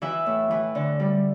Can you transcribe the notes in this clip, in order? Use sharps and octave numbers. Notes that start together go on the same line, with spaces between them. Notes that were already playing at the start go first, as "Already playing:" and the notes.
E3 E4 E5
A2
E3
D3
G3